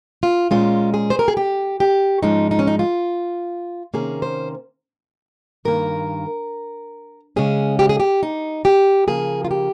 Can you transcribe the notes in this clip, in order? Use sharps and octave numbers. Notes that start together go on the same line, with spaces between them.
F4
A#2 G#3 C#4 F4
G#4
C5
A#4
G#4
G4
G4
G#2 F3 G#3 C#4 D#4
D#4
C#4
D#4
F4
C3 D#3 A#3 C#4 G#4
C5
G2 D#3 A#3 A#4
C#3 G#3 C#4 G#4
G4
G#4
G4
D#4
G4
C#3 F3 A#3 G#4
F4
G4